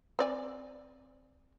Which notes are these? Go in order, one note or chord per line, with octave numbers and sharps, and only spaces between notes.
C4 D5 G#5